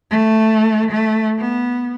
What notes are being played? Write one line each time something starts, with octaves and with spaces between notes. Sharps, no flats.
A3
A3
B3